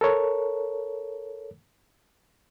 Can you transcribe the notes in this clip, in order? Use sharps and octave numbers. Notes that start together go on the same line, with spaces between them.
A4 A#4 C#5